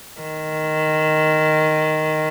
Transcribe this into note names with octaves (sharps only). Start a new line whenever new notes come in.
D#3